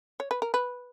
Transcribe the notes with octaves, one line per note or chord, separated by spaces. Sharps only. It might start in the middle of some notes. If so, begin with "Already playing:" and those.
C#5
B4
A#4
B4